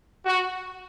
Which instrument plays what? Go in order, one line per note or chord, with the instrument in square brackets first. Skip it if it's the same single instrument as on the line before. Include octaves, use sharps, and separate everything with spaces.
[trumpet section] F#4